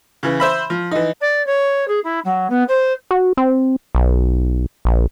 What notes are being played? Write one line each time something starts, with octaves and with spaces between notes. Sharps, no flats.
C#3 E3
C5 E5 B5
F3
E3 D#4
D5
C#5
G#4
E4
F#3
B3
C5
F#4
C4
B1
A#1